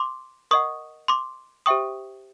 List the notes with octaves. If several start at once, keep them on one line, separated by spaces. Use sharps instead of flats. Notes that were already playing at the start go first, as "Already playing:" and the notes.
Already playing: C6 D6
A#4 D#5 F#5 C#6 D#6
C6 D6
G4 C5 E5 G5 C#6 D#6